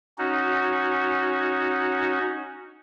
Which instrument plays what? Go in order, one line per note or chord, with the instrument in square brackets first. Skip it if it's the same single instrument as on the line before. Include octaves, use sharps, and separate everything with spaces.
[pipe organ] C#4 D#4 F#4